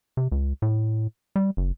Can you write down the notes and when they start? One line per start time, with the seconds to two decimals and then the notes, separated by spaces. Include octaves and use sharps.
0.17 C3
0.32 C#2
0.62 A2
1.36 G3
1.57 F#1